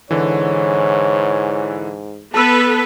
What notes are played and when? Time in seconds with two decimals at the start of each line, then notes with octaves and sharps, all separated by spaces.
0.11 G#2 D3 E3 C#5
2.34 B3 A4 B4 A5 E6